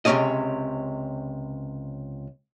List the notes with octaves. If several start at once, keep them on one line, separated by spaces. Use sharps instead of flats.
C#2 C3 F3 C#4 G#4 D#5